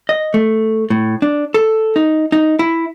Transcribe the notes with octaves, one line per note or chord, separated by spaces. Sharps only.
D#5
A3
A2
D4
A4
D#4
D#4
E4